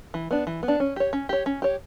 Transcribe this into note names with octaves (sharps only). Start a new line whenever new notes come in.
E3
B3 D4
E3
B3
D4
C#4
G4 C#5
C#4
G4 C#5
C#4
G4 C#5